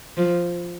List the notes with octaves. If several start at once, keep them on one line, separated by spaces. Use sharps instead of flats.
F3